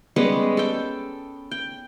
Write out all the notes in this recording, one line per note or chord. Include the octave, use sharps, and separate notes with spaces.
G3 G#3 B3 C#4
A4 G5
G5